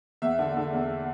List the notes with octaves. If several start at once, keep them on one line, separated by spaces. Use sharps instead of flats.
E2 E5
D3
D3
E2